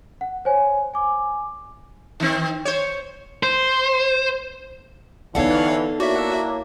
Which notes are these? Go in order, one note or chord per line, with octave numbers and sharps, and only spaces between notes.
F#5
C5 C#5 G#5
G#5 D6
D#3 C4
C5 C#5
C5
D3 E3 B3 D#4 A4 C#5 F5 F#5
A#3 D4 E4 F#4 C#5 E5